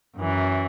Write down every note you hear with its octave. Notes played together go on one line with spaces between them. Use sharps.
F#2 E3